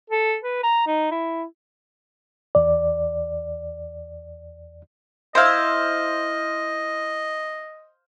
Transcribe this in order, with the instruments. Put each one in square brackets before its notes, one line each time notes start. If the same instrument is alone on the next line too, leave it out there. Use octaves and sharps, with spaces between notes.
[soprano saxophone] A4
B4
A#5
D#4
E4
[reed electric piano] E2 D5
[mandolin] E4 E6 [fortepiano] C5 F5 [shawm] D#5